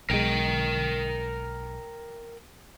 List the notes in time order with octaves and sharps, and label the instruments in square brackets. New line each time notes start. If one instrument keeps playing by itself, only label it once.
[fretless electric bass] B1 G#3 [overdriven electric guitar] A#4 G5